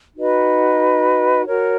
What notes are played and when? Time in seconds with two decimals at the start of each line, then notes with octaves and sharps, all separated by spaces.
0.16 D#4 F#4 B4 D#5
1.45 F#4 A#4 C#5